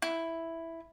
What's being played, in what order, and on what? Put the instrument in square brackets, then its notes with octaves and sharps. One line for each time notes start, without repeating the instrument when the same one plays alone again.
[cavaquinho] E4